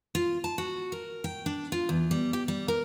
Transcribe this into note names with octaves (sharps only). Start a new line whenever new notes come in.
F4
A5
F#4
A#4
G5
D4
F4
E2
G3
G4
G3
A#4